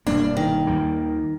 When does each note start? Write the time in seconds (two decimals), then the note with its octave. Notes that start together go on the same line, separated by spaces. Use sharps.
0.07 E1 G2 A#3 D4
0.37 D#3
0.67 D#2 G3 A#3